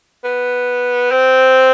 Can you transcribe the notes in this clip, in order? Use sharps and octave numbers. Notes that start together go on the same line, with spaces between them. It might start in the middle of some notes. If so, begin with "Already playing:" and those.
B3
C4